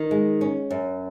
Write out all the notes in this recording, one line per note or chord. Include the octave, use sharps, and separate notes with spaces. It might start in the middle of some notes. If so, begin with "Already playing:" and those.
Already playing: D#3
G#3
C#4
F#2